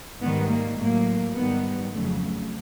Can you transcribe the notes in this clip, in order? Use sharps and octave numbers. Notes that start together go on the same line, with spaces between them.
G#2 D#3 G3 B3
A#3
A2 F#3 A#3
G#2 D#3 G3 B3
F2 C#3 F#3 A3
A3